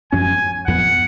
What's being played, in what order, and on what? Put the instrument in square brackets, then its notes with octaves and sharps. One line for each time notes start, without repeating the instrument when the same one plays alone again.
[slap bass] F#2 F3 G#3 C#4 [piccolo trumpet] G#5
[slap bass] F2 F3 B3 [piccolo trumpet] F#5